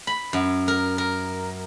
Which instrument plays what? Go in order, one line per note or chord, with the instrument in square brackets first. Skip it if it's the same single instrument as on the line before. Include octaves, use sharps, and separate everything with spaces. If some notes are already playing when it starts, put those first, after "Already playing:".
[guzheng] B5
F#2
A#4
A#4